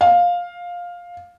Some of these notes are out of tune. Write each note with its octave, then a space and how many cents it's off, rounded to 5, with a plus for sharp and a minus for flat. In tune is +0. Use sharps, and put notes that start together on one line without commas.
F5 +10